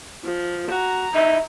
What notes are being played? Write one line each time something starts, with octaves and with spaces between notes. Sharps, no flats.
F3
F#4 A#5
D#4 E5